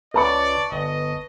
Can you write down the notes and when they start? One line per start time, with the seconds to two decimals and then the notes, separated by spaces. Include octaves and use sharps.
0.14 C#2 B4 D5 A5 C#6
0.72 G1 D#5